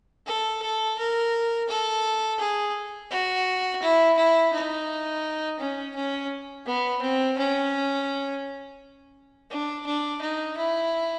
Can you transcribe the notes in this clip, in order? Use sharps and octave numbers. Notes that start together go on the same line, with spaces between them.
A4
A4
A#4
A4
G#4
F#4
E4
E4
D#4
C#4
C#4
B3
C4
C#4
D4
D4
D#4
E4